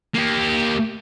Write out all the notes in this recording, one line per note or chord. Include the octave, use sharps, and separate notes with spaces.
A#3 G4